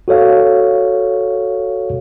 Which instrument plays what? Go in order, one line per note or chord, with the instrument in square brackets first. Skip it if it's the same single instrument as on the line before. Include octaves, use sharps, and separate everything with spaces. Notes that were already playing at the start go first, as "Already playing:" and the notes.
[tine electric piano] F#4 A4 C#5 F5